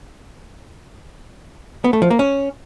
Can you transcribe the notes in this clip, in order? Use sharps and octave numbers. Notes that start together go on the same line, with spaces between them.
B3
A3
F3
A#3
C#4